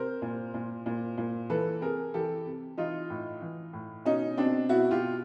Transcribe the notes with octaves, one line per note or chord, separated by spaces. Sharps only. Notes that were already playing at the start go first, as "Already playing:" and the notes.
Already playing: C3 A#4 C5
A#2
A#2
A#2
A#2
E3 A4 B4
C3 G#4 A#4
E3 G4 A4
C3
E3 D#4 F4
A2
E3
A2
B2 C#4 D#4
B2 C4 D4
B2 E4 F#4
F4 G4
B2